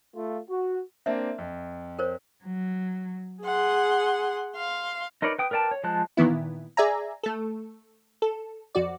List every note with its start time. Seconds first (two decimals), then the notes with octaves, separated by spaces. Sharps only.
0.15 A3 F4
0.49 F#4
1.06 A#3 C4 D4 E5
1.38 F2
1.99 A#4 C5 C#5
2.43 F#3
3.43 G#4 F#5 C6
4.56 F5 C6
5.22 D#4 A#4 B4 C#5 D5
5.39 B4 G5 D#6
5.51 A#4 B4 D5 G5 A5
5.71 C#5
5.84 F3 G#3 C5 A5 F#6
6.17 A#2 D#3 E3 B3 E4
6.77 G#4 D5 E5 G#5 A#5
7.23 A3 A4
8.22 A4
8.75 F2 F#4 D5